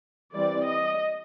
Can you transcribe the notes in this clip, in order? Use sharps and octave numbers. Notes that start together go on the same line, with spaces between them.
E3 G3 C4 D5
D#5